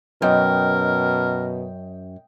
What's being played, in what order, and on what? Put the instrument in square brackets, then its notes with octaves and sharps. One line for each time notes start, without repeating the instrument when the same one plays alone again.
[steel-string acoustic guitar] F#2 [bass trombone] B2 [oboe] A#4 [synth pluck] D#5 G5